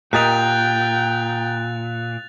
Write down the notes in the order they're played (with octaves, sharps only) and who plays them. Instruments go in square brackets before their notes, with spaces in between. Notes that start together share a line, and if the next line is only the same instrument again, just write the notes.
[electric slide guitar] A#2 [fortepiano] G4 A#4 D#5 [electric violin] G5 [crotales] F#6 A6 F7